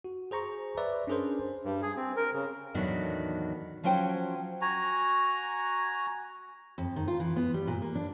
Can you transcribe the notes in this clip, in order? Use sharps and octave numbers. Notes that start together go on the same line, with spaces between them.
F#4
G#4 C5 A#5 C#6
B4 D5 E5
C#4 D4 G#4 A#4 C5
G2
G#4
C4
A#4
C#3
E2 A2 D#3 F#3 B3 D4
F3 F#3 C#4 C5 G5
F#4 G#5 A#5
F2
D#3
F4
E3
B3
G3
A#2
A#3
D4